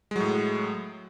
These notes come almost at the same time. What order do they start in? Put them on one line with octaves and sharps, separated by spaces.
G#3 F#3 A2